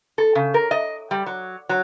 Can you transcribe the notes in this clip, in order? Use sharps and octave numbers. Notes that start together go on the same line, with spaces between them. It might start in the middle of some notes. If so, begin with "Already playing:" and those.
A4
C#3
A#4
D#5
G3
F#3
F#3